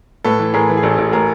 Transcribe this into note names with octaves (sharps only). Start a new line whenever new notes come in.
A2 A4 B4
E3
A2 G#4 A#4
E3
G#4
A1 A4
A1
A2 G#4 A#4